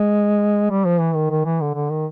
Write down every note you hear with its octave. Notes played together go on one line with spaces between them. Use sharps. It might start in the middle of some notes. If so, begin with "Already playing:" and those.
Already playing: G#3
G3
F3
E3
D#3
D#3
E3
D3
D3
D#3